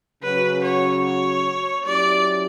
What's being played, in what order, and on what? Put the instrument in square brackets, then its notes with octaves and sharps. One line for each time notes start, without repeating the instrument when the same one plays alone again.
[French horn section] C#3 F#3 C#4 F#4 [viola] B4
[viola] C#5
C#5
[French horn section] F#3 C#4 E4 G4 [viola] D5